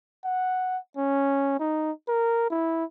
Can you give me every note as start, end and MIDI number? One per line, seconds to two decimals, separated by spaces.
0.25 0.78 78
0.97 1.55 61
1.60 1.92 63
2.08 2.49 70
2.50 2.84 64